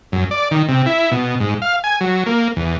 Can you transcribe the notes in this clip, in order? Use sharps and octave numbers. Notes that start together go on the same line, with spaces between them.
F#2
D5
D#3
C3
E4
B2
G#2
F5
G#5
F#3
A#3
E2